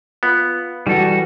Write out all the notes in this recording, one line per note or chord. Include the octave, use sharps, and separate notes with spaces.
B3 F4
E3 G3 F#4 A4